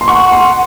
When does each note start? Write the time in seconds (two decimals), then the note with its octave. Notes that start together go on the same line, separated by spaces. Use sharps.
0.01 C6
0.08 F#5 C#6
0.32 C6